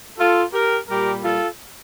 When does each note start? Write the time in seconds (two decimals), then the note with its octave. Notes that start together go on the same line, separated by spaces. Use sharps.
0.18 F4 A4
0.53 G4 A#4
0.89 A#2 G3 G4 A#4
1.24 F4 A4